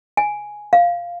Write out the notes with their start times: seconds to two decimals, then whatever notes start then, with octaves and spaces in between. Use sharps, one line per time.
0.17 G#5
0.73 F5